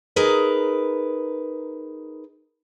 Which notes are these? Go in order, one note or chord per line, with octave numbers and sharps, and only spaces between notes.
D#4 G#4 A#4 B4